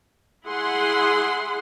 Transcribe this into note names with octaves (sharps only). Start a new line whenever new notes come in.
E4 G#4 F#5 C6